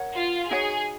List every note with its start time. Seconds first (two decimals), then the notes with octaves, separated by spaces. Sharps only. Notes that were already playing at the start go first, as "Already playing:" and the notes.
Already playing: A#4 C#5 F#5
0.16 F4
0.50 D#4 F#4 G#4 C#5 F#5